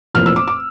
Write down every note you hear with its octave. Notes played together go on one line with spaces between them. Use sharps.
F1 F2 E3 A#3 F4 F6
E6
D6
D6